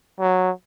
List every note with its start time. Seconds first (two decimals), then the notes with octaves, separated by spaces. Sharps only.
0.20 F#3